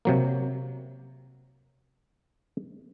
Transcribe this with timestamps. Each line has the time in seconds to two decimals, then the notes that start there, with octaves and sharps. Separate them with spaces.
0.05 C3 F#3 A#3